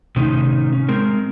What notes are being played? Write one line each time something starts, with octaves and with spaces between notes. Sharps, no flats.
A2 C3 D#3 C#4 D#4
C#4
G#3 C4 A#4